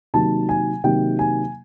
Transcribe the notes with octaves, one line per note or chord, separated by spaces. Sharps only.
C3 D#3 F#3 A#3 A5
G#5
C3 D#3 F#3 A#3 G5
G#5